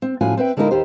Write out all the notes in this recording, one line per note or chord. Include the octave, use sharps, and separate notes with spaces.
C4
A2 F3 C#4 F4 F#4 G#5
C4 B4 E5 G5
D3 G#3 A#3 D#4 E4 A#4
D#2 G4 C5